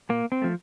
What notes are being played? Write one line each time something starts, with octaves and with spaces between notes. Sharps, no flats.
A#2 A#3
C4
F3 A3